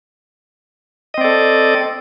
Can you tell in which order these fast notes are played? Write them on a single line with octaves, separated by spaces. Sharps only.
D#5 C4 D5 A4